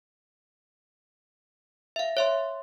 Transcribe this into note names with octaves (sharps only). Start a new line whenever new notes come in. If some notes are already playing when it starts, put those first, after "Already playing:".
E5 F5
C#5 E5 C6